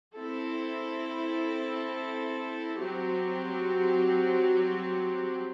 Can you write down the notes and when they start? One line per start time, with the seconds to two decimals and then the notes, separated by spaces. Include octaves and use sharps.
0.15 C4 E4 A4
2.78 F#3 C4 G4